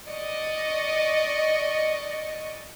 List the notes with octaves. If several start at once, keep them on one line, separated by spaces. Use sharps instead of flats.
D5 D#5 C#6